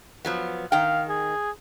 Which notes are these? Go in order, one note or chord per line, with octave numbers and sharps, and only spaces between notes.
F3 F#3 B3
D#3 F5 G5
G#4